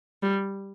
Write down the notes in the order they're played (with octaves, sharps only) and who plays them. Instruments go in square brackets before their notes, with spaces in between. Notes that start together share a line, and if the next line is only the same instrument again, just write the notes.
[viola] G3